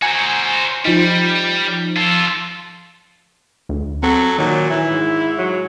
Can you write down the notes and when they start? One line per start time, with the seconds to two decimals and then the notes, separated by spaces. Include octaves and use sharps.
0.02 F#4 C5 G#5 A#5
0.85 F3 G3 D#4
1.96 F4 A4
3.69 D2
4.03 F#3 C4 A4
4.38 A#2 D#3 F#3
4.70 E3 E4
4.90 G#2
5.39 F#3